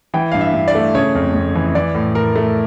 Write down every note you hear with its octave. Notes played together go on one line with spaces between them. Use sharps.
E3 G5
G2 F5
E5
G2
D5
A3
C#3 C#5
F2
F2
E3
E3 D5
A2
A2 A#4
A3